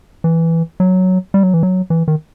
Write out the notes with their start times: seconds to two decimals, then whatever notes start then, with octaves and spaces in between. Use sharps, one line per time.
0.24 E3
0.80 F#3
1.34 G3
1.43 F#3
1.54 E3
1.63 F#3
1.90 E3
2.08 D#3